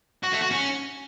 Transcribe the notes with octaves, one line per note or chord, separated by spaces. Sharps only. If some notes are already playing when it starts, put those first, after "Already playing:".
F#4
A3
F#4
C#4